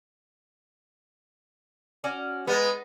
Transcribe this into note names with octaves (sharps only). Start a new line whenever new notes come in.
C#4 F#4 D5
G#3 B3 D#4 B4